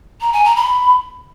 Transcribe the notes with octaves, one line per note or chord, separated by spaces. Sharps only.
A#5
G#5
A#5
B5